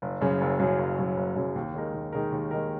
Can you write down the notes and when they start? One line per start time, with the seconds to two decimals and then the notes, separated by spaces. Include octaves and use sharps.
0.02 F#1
0.21 F#2 C#3 F#3
0.41 F#1
0.60 F#2 C#3 F#3
0.79 F#1
0.99 F#2 C#3 F#3
1.17 F#1
1.36 F#2 C#3 F#3
1.56 D#2
1.74 D#3 G#3 D#4 A#4
1.94 D#2
2.13 D#3 G#3 D#4 A#4
2.32 D#2
2.51 D#3 G#3 D#4 A#4